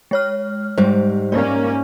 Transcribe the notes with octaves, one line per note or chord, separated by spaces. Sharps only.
G#3 C#5 F6
G#2 G3 G#3 G4 C5
A#3 C#4 D5